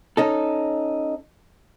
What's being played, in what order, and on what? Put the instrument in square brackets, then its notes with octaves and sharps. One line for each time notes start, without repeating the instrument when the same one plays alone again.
[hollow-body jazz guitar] C#4 D#4 A4